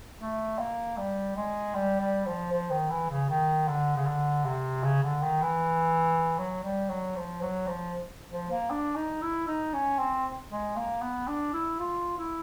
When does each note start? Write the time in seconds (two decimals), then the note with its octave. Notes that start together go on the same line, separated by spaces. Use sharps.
0.20 A3
0.59 A#3
0.97 G3
1.36 G#3
1.74 G3
2.00 G3
2.26 F3
2.52 F3
2.71 D#3
2.90 E3
3.10 C#3
3.29 D#3
3.68 D3
3.96 C#3
4.06 D3
4.45 C3
4.84 C#3
5.03 D3
5.22 D#3
5.42 E3
6.38 F#3
6.63 G3
6.90 F#3
7.16 F3
7.42 F#3
7.67 F3
8.31 F3
8.51 A#3
8.70 D4
8.96 D#4
9.21 E4
9.47 D#4
9.73 C#4
9.98 C4
10.50 G#3
10.76 A#3
11.02 B3
11.28 D4
11.53 E4
11.79 F4
12.18 E4